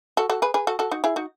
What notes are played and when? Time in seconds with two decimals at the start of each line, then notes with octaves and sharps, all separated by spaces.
0.17 F#4 A4
0.30 F#4 A4
0.42 G#4 B4
0.54 G#4 B4
0.67 F#4 A4
0.79 F#4 A4
0.91 D#4 F#4
1.04 E4 G#4
1.16 D#4 F#4